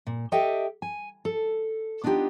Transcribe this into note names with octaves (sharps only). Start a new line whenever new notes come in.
A#2
G4 A4 D#5 E5 G5
G#5
A4
B3 D4 D#4 F4 G4